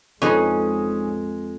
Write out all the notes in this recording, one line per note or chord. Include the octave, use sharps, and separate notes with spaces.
F2 G#3 C#4 D#4 G#4 B4